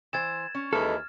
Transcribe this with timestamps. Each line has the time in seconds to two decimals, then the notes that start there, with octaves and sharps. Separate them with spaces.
0.13 E3 C5 G#6 A6 E7
0.55 C#4
0.73 D#2 E3 G#3 A4 F6